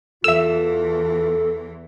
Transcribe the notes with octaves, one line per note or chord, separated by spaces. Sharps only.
E2 E3 F4 A4 E5 E6